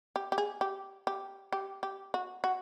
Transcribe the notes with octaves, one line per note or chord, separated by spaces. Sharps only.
G4
G4
G#4
G4
G4
G4
G4
F#4
F#4